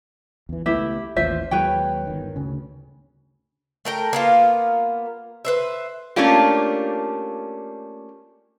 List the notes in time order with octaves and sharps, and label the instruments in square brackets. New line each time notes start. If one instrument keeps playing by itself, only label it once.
[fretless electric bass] E2 E3
[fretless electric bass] C#2 A3 B3 [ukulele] E4 G4 E5
[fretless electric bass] A1 D#2 E3 [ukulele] F4 C5 E5
[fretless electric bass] D#2 F#3 G#3 [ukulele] B4 C#5 G5
[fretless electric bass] G1 D#3
D2 C#3 C#4
[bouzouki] A3 A#4 G5
A#3 B3 F4
B4 C5 E5
[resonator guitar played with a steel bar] A3 A#3 C#4 D4 F4 G4